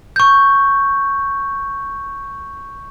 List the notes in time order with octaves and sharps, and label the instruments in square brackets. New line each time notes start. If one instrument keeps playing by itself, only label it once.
[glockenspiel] C#6 G6